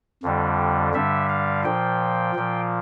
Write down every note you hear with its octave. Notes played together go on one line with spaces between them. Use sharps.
F2 D3 G3
G2 D3 G3 E5
F5
A#2 F3 G5
A#2 F3